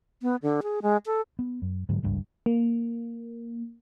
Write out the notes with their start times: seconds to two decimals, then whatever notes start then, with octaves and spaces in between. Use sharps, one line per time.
0.22 B3
0.43 D3
0.63 G#4
0.82 G#3
1.06 A4
1.39 B3
1.62 F#2
1.89 G#2 D3 F#3
2.03 G#1 C#2 G2
2.46 A#3